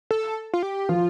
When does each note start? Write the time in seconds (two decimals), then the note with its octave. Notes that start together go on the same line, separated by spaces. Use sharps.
0.11 A4
0.54 F4
0.63 G4
0.89 F3 F4